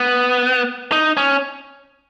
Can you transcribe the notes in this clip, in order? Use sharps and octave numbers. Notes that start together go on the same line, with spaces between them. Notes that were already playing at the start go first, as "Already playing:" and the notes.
Already playing: B3
D#4
C#4